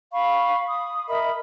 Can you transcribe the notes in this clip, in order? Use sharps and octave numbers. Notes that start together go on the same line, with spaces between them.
F5 B5 C#6
D#6
A#4 D#5 E5 B5